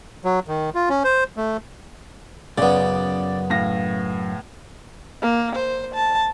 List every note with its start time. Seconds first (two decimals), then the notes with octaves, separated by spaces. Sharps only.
0.25 F#3
0.48 D#3
0.75 F4
0.89 C#4
1.04 C5
1.37 A3
2.58 B1 F#2 C#3 B3 D5
3.50 A2 F5 A#6
5.22 A#3
5.56 C5
5.94 A5